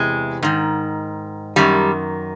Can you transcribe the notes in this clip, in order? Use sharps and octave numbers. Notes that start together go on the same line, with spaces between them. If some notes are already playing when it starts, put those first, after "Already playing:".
Already playing: E2 C3 E3 G#3
G#2 D#3
F#2 D#3 G3